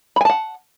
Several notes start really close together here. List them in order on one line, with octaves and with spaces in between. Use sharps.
B5 G#5 A5 F#5